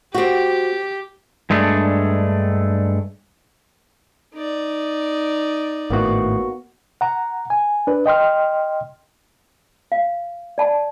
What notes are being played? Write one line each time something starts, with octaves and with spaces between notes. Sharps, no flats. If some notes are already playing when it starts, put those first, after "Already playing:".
C4 F#4 G4
G2 G#3 A3 D4
D#4 D5
G#1 A2 A#3 B3 F#4
F#5 A#5
G#5
D4 B4
D#5 G5 C6 F6
F5
D5 A5 B5